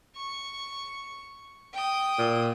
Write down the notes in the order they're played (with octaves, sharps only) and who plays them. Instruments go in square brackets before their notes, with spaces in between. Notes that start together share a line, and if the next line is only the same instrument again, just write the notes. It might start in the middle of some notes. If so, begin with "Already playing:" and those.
[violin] C#6
G5 D#6
[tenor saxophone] A#2